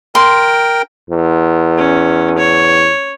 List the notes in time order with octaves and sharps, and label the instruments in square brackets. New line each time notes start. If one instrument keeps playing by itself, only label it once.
[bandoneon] A#4 G5 [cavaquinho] C6
[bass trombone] E2
[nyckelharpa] C#4
C#5